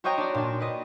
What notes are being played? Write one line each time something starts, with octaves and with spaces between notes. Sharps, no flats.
F#4 C5 C#5 D#5 G5 A#5
D4 D5
A#2 D4
B4 D#5